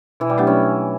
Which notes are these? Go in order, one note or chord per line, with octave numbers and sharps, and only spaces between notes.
B2 E3
G3
F#3 A3 B3 D4 G4
C#4